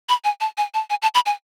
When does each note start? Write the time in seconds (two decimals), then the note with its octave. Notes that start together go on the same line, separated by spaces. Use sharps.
0.09 B5
0.24 G#5
0.41 A5
0.58 G#5
0.74 A5
0.90 G#5
1.02 A5
1.15 B5
1.26 G#5